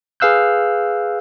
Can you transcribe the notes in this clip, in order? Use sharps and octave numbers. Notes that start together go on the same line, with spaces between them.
G#4 B4 F5 E6 F#6 G6